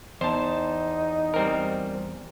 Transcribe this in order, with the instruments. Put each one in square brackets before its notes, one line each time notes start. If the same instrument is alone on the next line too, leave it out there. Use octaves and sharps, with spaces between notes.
[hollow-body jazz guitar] E2 [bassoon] D#4 [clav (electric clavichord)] C5 A5
[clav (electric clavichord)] G3 C4 A#4